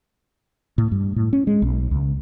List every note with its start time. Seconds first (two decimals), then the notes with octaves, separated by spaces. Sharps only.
0.78 A2
0.92 G2
1.16 A2
1.33 C#4
1.47 G#3
1.62 B1
1.91 C#2